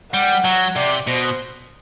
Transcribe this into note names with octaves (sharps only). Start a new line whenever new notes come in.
G3 F#5
F#3
C3 D5
B2 C5